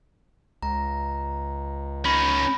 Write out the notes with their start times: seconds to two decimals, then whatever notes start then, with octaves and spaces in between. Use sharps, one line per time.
0.63 C#2 A#5
2.05 C#4 D#4 B5